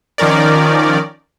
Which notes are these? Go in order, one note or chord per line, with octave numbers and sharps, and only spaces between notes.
D#3 F3 C#4 A#4 D5